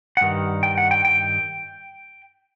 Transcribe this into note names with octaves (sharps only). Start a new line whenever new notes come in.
F#5
G2 D#3
G5
F#5
G5
G5